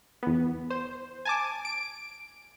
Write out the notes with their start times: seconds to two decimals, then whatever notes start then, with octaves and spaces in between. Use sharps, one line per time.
0.23 E2 B3
0.70 C5
1.25 G#5 A5 D6
1.65 D7